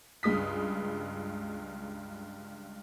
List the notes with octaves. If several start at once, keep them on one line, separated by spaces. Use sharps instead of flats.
C#2 G2 G#3 D#6 B6